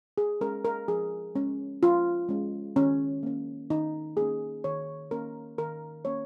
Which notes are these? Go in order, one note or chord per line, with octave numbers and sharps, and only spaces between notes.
G#4
G#3 C#4 A#4
A#4
F3 G#4
G#3 C#4
F3 F4
G#3 C#4
D#3 C#4
A#3 C#4
D#3 D#4
A#3 C#4 G#4
D#3 C#5
A#3 C#4 A#4
D#3 A#4
A#3 C#4 C#5